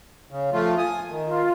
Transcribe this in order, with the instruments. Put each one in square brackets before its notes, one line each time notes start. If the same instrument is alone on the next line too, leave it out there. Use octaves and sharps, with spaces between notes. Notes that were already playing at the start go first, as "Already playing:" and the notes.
[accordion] C#3
F3 A3 F4
G#5 D#6
D#3
[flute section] F4